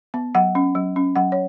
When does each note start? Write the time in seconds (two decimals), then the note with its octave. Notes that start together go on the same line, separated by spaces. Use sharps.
0.14 B3
0.35 F#3 F#5
0.55 C#4
0.75 F#3
0.96 C#4
1.16 F#3 F#5
1.32 C#5